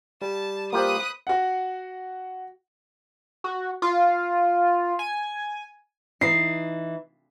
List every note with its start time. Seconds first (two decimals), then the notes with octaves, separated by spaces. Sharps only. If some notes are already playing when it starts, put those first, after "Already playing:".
0.22 G3 A5
0.73 A#3 F4 G4 B4 C5 B5 D#6 F#6
1.27 F#4 F#5
3.44 F#4
3.82 F4
4.99 G#5
6.21 E3 D#4 C7